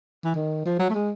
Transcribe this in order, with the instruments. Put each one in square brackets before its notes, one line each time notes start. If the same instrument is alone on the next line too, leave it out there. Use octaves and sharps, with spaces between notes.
[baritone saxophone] E3
D#3
F3
F#3
A3
G#3